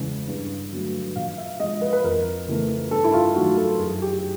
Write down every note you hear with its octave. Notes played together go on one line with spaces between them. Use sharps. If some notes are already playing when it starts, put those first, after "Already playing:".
Already playing: E2 C#3 E3 G#3
G2
D3 F#3 A3
A#2 F5
E5
F3 G#3 D#5
B4
B4
F2 A#4
C#3 E3 A3
G2 A4
E4
F4
D#3 F#3 A3 F#4
A4
F#2 G#4
G4